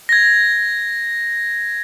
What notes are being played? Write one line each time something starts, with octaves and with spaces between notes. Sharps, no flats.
G#6 A#6